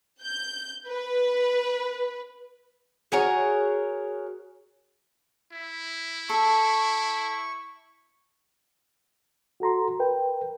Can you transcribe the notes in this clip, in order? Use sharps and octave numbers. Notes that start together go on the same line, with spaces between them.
G6
B4
F#4 G#4 A#4 C#5
E4
A4 C#6
F#4 A4 A#5 C6
A#4 B4 G5